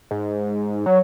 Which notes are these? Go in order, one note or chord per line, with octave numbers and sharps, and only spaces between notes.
G#2
F#3 C#5